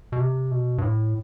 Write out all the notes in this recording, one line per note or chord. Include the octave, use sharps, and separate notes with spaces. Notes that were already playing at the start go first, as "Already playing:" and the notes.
B2
C3
B2
G2
A2